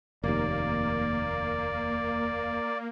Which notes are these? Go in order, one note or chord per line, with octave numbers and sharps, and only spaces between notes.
F1 D#2 A#3 D5